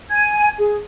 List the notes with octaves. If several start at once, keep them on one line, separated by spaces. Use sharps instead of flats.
G#5 G#6
G#4